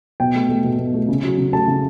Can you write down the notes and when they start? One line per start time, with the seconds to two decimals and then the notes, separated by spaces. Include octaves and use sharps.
0.20 B2 G5
0.35 A3
0.49 A3
0.64 B2
0.79 B2
0.94 A3
1.09 C#3
1.24 F#3
1.38 C#3
1.53 A3 A5
1.68 C#3